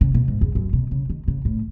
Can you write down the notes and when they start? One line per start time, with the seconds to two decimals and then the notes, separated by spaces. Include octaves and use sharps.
0.01 C#3
0.14 B2
0.28 G#2
0.41 E2
0.55 F#2
0.73 B2
0.91 C#3
1.10 D#3
1.28 C#3
1.45 A2